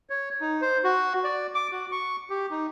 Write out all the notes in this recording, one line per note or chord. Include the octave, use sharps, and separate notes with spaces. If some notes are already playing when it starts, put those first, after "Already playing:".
C#5
D#4
C5
F#4
D5
D6
F#4
C#6
G4
D#4